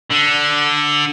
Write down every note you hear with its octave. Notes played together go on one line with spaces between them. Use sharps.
D3